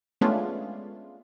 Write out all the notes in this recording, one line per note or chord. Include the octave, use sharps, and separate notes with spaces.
G#3 A3 B3 C#4 D4 F4